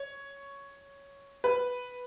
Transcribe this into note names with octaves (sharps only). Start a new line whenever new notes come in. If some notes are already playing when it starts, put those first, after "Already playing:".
Already playing: C#5
B4